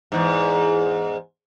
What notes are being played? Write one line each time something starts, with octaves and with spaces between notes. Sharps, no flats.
E2 G#2